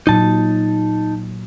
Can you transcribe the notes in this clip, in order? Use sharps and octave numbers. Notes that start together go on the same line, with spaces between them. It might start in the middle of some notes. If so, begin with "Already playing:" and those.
A#2 F#3 D#4 A5